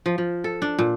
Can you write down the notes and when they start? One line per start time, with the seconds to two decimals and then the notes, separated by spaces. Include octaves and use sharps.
0.06 F3
0.18 F3
0.44 A4
0.62 D4
0.79 A#2